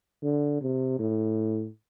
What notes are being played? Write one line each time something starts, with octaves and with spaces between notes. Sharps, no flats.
D3
C3
A2